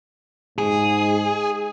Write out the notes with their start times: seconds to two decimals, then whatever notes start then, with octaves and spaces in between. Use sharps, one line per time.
0.58 G#2 G#4